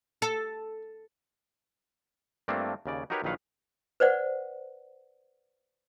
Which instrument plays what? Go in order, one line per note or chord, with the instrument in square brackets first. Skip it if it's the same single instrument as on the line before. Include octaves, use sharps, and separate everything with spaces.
[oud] A4
[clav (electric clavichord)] G2 A3 A#3 C4 D4 F4
D#2 C#3 D5
D#4 F#4 G4 A#4 B4 C#5
A#1 D#3 F#3 B4 F5 F#5
[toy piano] B4 C5 D5 F#5